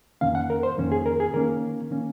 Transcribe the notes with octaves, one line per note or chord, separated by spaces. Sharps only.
F2 D#3 A#3 C#4 F5
F#5
A#4
C5
F2 D#3 A#3 C#4
G#4
A#4
G#4
D#3 A#3 C#4 A#4
D#3 A#3 C#4